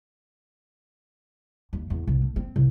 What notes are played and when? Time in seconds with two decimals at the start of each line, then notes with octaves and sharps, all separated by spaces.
1.73 D#2
1.90 E2
2.07 C2
2.22 A3
2.36 C4
2.56 C2